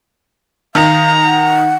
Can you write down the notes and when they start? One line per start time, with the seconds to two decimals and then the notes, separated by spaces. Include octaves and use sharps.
0.75 D#3 D#4 F5 A#5
1.24 F#5